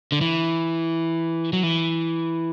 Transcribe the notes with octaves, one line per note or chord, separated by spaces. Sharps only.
D3
E3
F#3
E3